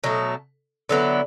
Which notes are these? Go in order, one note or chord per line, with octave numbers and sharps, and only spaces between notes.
B2 F#3 A3
D3 F#3 B3 E4